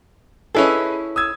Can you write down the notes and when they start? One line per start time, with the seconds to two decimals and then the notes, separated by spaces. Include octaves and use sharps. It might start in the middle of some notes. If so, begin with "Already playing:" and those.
0.55 C#4 E4 G#4 A4 B4 D#5
1.16 D#6 E6 G#6